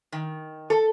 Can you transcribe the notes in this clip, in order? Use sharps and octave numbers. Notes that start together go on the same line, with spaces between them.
D#3
A4